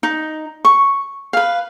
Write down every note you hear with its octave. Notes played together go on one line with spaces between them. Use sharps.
D#4
C#6
B4 F5